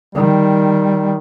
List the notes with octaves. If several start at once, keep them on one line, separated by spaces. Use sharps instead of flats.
D#3 G3